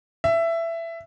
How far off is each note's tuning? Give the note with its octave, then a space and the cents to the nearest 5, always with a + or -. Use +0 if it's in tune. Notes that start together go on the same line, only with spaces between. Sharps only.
E5 +15